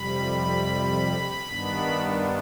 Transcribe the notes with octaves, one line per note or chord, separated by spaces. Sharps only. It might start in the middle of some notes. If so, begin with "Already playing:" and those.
Already playing: F2 C3 G3 B5
G2 D#3 B3 D4